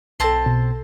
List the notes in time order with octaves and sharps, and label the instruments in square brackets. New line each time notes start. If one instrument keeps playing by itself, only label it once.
[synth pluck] B1 A4 [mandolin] C4 A5 C6
[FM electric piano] B2